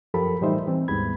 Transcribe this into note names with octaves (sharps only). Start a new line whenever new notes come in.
F#2 F3 G4 A4 A#4 B5
A2 E3 G3 D#4 C5 E5
E3 C4
D#2 G#2 G3 B3 B5 G#6